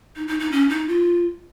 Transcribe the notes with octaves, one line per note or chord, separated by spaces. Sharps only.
D#4
D#4
D#4
C#4
D#4
F4